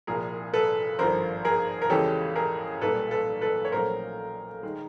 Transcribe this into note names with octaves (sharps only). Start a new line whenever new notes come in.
C2 A#2 F3 G#4 A#4
A4 B4
G#1 G2 D3 F3 A#4 C5
G#4 A#4
A#4
E2 C#3 E3 G#3 C#4 G4 A4
G#4 A#4
B1 A#2 G3 A#3 A4 B4
A4 B4
A4 B4
C#5
A#1 A#2 F#3 A3 C#4 A#4 C5
D#3 G#3